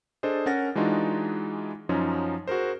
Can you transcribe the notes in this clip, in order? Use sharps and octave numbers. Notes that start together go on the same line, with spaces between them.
D4 G#4 A4 C5 D#5
C#4 A#4 F#5 A6 A#6
E3 G#3 D4 D#4 F4 F#4
F#2 F3 F#3 C#4 D#4
F#4 G#4 A#4 C5